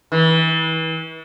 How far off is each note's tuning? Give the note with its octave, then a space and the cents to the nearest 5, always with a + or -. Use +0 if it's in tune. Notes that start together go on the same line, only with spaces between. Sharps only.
E3 -35